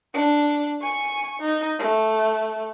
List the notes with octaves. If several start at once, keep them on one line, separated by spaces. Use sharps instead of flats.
D4
G#5 C#6
D#4
A3